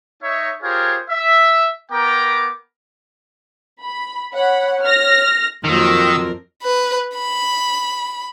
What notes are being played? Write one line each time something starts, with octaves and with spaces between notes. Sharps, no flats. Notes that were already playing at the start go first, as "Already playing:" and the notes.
D#4 C#5 E5
F4 G4 G#4 A#4 C5 C#5
E5
B3 A#4 G5 A#5 B5 D6
B5
C#5 F#5 B5
F6 A#6
F2 D#3 F#3 A#3 C4 F4 A#4 E6
B4
B5